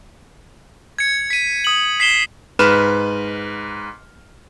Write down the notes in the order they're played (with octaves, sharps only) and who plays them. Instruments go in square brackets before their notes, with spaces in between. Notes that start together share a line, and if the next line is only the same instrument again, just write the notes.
[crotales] G#6 C#7
B6 D#7
D#6 F#7
B6 C7 E7 G7
[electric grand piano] G#2 B4 F6 E7